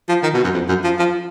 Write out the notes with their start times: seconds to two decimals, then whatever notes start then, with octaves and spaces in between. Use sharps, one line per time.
0.09 F3
0.23 D#3
0.34 B2
0.44 F#2
0.54 F2
0.69 F#2
0.84 F3
0.99 F3